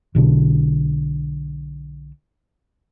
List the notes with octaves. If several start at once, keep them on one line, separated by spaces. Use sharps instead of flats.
B1 B2 D3